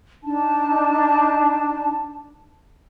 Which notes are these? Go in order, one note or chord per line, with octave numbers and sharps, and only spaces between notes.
D4 D#4 A5